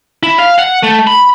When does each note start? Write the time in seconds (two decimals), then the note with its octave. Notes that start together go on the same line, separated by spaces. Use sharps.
0.23 E4
0.38 F5
0.58 F#5
0.83 A3
1.07 B5